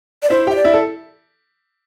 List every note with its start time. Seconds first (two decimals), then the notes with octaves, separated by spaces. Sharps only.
0.23 D5
0.30 E4 C5 E5
0.47 G4 E5 G5
0.56 D5
0.64 E4 E5
0.74 A4